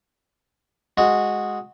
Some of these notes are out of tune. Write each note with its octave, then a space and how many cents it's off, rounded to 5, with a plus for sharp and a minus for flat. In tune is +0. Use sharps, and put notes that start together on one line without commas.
G#3 +0 F#4 -10